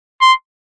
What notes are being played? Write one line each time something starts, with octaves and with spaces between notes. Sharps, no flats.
C6